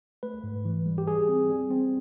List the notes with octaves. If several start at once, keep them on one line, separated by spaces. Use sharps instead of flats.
A3 B4
G#2
E3
G3
G4
G3 G#4
C4
G3
C4